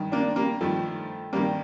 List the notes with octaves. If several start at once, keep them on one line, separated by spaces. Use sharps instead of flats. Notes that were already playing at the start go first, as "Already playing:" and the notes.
Already playing: G2 D#3
A#3 D4
G3 A#3
G2 D#3 F3 A3
G2 D#3 G3 A#3